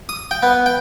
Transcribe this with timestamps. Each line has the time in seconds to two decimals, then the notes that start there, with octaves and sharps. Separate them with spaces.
0.09 D#6
0.31 G5
0.43 B3
0.66 G5